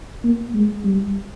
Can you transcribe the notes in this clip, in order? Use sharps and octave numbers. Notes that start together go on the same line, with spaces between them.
A#3
G#3
G3